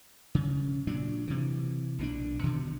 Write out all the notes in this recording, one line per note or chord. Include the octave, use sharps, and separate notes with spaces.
C#3
A#2 F#3 D4
C3 E3
B1 A#2 G3 D4
B2 D3 D#3